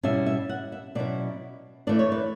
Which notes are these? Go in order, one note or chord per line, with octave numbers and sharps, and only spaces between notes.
B2 G3 C#4 E4 E5
E5
F#5
E5
B2 F#3 C#4 E4 D5
E3 A3 D4 D5
C#5
B4